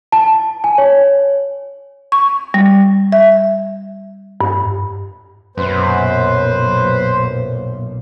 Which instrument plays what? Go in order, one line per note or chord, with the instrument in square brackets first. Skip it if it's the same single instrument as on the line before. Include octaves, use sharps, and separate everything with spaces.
[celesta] A5
G#5
C#5
[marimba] C#6
G3
E5
G2
[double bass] B1 A#2 [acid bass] F#2 [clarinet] B4 [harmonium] C5